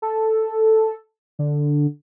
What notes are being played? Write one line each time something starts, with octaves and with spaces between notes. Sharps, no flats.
A4
D3